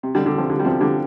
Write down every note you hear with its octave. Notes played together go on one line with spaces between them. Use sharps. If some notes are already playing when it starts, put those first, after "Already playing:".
C3
D3 G3
D3
C3 F3
D3
G3
C3 F3
D3 G3